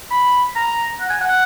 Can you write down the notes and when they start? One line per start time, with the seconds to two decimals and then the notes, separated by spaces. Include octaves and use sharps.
0.11 B5
0.56 A#5
1.00 F#5
1.10 G#5
1.21 F#5